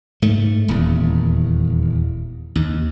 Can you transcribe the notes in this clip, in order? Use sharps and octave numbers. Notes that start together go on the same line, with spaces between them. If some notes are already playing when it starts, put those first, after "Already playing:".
G#2 A3
D#1 E2
D#2